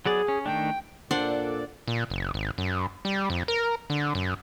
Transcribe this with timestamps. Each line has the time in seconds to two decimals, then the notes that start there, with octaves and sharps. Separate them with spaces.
0.06 F#3 B3 G#4 D5
0.28 C#4
0.46 D#3 A3 D4 G5
1.11 A#2 D4 A4 C5 D5 F#5
1.88 A#2
2.10 F#1
2.34 G#1
2.58 F#2
3.05 G3
3.30 F2
3.48 A#4
3.90 D3
4.15 F#2